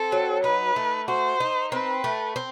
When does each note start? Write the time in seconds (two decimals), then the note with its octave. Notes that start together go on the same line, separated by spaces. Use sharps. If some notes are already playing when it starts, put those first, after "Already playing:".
Already playing: C4 A4
0.12 F#3
0.44 D#4 B4
0.76 A3
1.08 F#4 C5
1.40 D#4
1.72 C4 B4
2.04 A3
2.36 C4